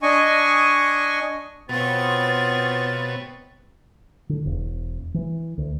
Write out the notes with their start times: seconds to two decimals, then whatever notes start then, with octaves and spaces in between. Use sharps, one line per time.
0.02 D4 D#5 G#5 C#6
1.69 B2 B3 C4 F4 C5 C#5 A6
4.29 D3
4.45 E1
5.14 E3
5.58 D2